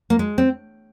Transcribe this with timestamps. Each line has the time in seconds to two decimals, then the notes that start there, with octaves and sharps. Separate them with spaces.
0.10 A#3
0.19 G#3
0.38 C4